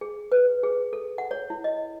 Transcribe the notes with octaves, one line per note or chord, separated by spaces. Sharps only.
G#4
B4
G#4
A4
F#5
C#5
E4
D#5